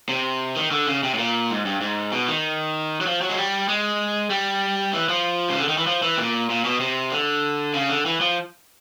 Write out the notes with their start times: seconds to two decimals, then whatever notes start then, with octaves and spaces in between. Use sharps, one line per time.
0.09 C3
0.56 D#3
0.71 D3
0.87 C#3
1.03 C3
1.14 A2
1.18 A#2
1.50 G#2
1.65 G2
1.81 G#2
2.12 B2
2.28 D#3
3.01 F#3
3.06 F3
3.21 F#3
3.30 G#3
3.37 G3
3.69 G#3
4.30 G3
4.93 E3
5.09 F3
5.50 C#3
5.59 D3
5.69 D#3
5.78 E3
5.87 F3
6.03 E3
6.18 A#2
6.50 A#2
6.65 B2
6.80 C3
7.12 D3
7.74 C#3
7.90 D3
8.06 E3
8.21 F3